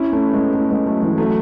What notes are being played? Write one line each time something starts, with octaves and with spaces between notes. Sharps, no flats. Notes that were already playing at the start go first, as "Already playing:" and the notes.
Already playing: C#4 E4
A3 C#4
G#3 B3
A3 C#4
G#3 B3
F#3 A3
E3 G#3
F#3 A3